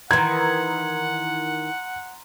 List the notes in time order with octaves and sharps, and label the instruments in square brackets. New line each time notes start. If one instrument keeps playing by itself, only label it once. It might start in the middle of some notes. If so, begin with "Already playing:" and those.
[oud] D#3 E3 [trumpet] F#5 [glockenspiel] A#5 C6 F#7 [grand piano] G#6